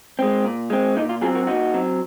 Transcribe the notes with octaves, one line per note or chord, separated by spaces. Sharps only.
G#3 C4
A#2
G#3 C4
A#2 D#4
F4
F#3 C4 F4 G#4
F#4 A#4
A#2 D#4 F#4
F#3 C4